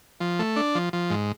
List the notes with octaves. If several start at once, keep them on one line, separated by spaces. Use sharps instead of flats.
F3
A3
D4
F3
F3
G#2